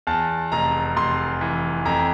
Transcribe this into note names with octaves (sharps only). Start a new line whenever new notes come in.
E2 A5
F1 A#5
F1 C6
E3
F2 A#5